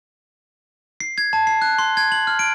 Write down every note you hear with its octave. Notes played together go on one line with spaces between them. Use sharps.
C7
G#6
A5
C7
F#6
C6
G#6
F#7
F6
D7